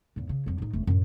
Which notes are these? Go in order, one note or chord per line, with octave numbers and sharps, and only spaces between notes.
E2 G#2
C#3
F2 F#3
A2 D#4
E1 A3
F#2 A2